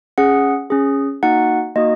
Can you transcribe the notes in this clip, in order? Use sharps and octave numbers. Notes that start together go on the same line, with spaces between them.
C#4 G#4 F#5
C#4 G#4
A#3 D#4 F#4 F#5
A#3 D#4 F#4 D#5